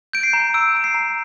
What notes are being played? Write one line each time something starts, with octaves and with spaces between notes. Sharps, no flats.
G6 D7
C7
A#5
E6 D7
A#5 D7
C7
A#5